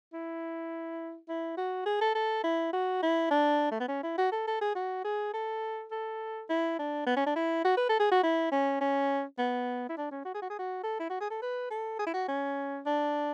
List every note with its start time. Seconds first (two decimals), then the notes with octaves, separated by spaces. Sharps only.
0.13 E4
1.29 E4
1.57 F#4
1.86 G#4
2.01 A4
2.15 A4
2.44 E4
2.73 F#4
3.02 E4
3.31 D4
3.71 A3
3.80 B3
3.88 C#4
4.03 E4
4.18 F#4
4.32 A4
4.47 A4
4.61 G#4
4.75 F#4
5.05 G#4
5.34 A4
5.92 A4
6.49 E4
6.79 D4
7.06 B3
7.17 C#4
7.26 D4
7.36 E4
7.65 F#4
7.77 B4
7.89 A4
8.00 G#4
8.11 F#4
8.23 E4
8.52 C#4
8.81 C#4
9.38 B3
9.89 E4
9.97 D4
10.11 C#4
10.25 F#4
10.34 G#4
10.42 F#4
10.50 G#4
10.59 F#4
10.83 A4
10.99 E4
11.10 F#4
11.20 G#4
11.30 A4
11.42 B4
11.70 A4
11.99 G#4
12.07 E4
12.13 F#4
12.28 C#4
12.86 D4